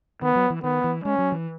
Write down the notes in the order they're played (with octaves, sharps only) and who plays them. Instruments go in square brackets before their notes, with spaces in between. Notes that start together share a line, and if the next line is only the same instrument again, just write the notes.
[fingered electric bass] D#3 [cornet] B3
[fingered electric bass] F#3
E3
[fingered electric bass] D#3 [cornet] B3
[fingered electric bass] E3
[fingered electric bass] G#3 [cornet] C#4
[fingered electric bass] F#3
E3